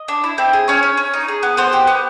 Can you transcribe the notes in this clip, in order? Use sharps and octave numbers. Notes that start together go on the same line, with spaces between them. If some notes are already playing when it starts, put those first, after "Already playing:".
Already playing: D#5
D4
E4
C4
G#4
C#4 C#5
C#4
C#4
D#4
G#4
B3
B3 C5
G4
B3